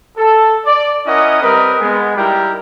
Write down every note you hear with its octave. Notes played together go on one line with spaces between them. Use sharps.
A4
D5
C#4 E4 A#4 D#5 F#5 D#6
G3 C4 A#4 B4 D#5
G#3 B3
G3 D#4 E4 G4 A#4 G5